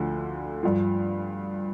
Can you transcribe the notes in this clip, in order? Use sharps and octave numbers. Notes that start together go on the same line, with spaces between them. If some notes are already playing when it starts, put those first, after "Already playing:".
Already playing: D2 D3 F3
G2 F3